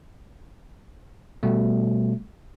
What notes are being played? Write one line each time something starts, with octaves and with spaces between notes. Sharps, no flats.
B2 G3 A3